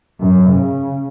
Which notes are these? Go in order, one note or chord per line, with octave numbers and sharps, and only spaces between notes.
F#2
C#3